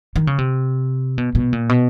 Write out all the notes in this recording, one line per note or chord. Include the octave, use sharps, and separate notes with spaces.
D#3
C#3
C3
B2
B2
A#2
B2